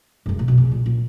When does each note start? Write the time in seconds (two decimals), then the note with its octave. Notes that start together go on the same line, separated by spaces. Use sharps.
0.26 G#2
0.29 F#2
0.39 A#2
0.48 B2
0.58 C#3
0.71 A#2
0.86 A#2